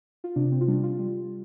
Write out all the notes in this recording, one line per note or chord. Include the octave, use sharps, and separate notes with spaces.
F4
C3 D4
C4
F4
G3 D4
F4
G3